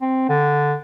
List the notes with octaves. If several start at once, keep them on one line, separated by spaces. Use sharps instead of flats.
C4
D3